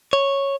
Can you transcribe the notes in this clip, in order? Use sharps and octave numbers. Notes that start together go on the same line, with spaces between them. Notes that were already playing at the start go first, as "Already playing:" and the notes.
C#5